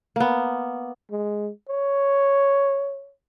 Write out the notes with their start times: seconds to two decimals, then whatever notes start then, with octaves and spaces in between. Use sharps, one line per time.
0.16 A#3 B3
1.11 G#3
1.69 C#5